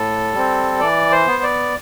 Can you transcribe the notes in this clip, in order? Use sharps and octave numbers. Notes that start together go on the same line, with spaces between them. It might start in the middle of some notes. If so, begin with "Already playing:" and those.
Already playing: A2 A4
G3 C4
E3 D5
C5
B3
D5